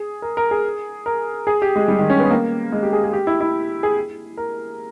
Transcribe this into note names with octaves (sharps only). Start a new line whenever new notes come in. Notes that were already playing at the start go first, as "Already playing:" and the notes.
Already playing: G#4
A#4
A#4
G#4
A#4
G#4
G4
G#3
G3
D#3
C#4
B3
A#3
G#3
G4
G#4
G#4
G4
E4
E4
G#4
A#4